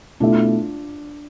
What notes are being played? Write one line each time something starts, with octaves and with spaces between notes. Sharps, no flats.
B2 A3 D4 E4 F4 A4 E5